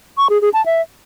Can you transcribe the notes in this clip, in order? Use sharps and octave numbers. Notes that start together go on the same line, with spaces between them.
C#6
G#4
G#4
A5
E5